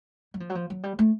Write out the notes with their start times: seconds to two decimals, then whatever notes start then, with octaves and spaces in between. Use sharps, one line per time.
0.34 F#3
0.40 F3
0.50 F#3
0.55 F3
0.70 F#3
0.83 G3
0.99 A3